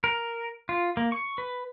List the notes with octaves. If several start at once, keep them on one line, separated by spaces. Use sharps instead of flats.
A#4
F4
A#3
C#6
B4